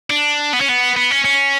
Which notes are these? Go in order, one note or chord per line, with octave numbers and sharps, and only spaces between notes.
D4
B3
C#4
B3
B3
C#4
C#4